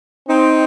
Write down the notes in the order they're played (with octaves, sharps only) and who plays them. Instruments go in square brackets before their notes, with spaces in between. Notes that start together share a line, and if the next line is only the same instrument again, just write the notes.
[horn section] C4 D#4